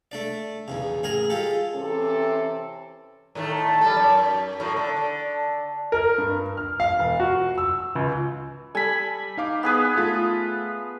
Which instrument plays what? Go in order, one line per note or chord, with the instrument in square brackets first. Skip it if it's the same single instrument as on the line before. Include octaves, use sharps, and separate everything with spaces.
[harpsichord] A3 D4 D5
B1 E2 C#3
A1 G#4 A#4 G#5 A#5
G#3 F4 G4 A4
[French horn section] C3 E3 C4 C#4 A4
[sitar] A2 D#3 A3
G3 A4
F#2
A2 A#3
D3
D3
[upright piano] A#4
G2
F6
F5
E1
F#4
E6
C#2
[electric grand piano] G3 A4 [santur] G#5 B5
[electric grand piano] D#4 F5 D6
[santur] B3 G#4 B4
[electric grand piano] A3 F4 A4